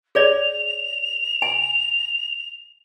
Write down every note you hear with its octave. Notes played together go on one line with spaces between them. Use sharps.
G#4 C#5 D5 F7
G#5